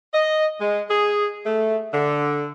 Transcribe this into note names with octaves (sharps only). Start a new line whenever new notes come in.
D#5
G#3
G#4
A3
D3